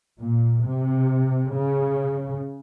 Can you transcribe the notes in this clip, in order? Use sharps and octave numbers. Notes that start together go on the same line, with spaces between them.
A#2
C3
C#3